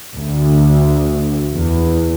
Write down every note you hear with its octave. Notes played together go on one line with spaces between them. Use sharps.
D2
E2